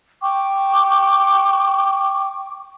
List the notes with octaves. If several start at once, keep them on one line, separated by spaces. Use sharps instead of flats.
G5 C#6 D6